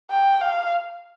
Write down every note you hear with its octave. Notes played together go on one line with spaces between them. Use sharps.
G5
F5